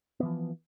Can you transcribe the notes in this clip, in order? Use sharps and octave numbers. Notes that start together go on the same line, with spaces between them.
E3 F3 B3